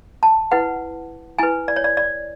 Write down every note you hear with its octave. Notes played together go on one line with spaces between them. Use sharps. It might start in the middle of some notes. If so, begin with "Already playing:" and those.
A5
E4 B4 F#5
E4 B4 G#5
D5
C#5
D5
D5